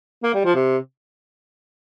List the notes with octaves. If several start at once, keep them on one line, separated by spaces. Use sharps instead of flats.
A#3
G3
F3
C3